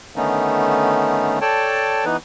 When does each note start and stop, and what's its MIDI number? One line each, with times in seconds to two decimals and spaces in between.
0.16 1.39 50
0.16 1.39 51
0.16 1.39 57
0.16 1.39 59
0.16 1.39 61
0.16 1.39 63
1.41 2.05 69
1.41 2.05 73
1.41 2.05 74
1.41 2.05 79
1.41 2.05 81
2.05 2.17 52
2.05 2.17 59
2.05 2.17 63
2.05 2.17 71